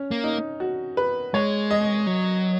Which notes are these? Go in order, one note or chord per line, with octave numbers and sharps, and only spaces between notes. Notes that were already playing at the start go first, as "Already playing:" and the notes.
Already playing: C#4
A#3
D#4
F#4
B4
G#3 C#5
D#5
F#3